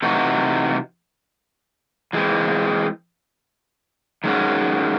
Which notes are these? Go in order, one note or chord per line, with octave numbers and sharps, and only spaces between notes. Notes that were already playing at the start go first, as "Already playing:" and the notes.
C3 E3 A3 D#4 F#4
E3 G#3 C4
D#3 G#3 C#4 F#4